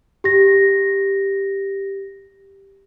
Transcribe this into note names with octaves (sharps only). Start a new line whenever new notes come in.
G4 A#6